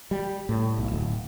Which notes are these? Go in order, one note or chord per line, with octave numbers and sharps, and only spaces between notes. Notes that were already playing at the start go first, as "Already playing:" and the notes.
G3
A2
B1
D1